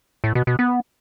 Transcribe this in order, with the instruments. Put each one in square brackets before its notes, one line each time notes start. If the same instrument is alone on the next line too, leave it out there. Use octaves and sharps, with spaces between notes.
[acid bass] A2
B2
B2
B3